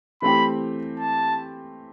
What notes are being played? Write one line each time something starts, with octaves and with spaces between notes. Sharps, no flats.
E3 A3 C4 G4 B5
A5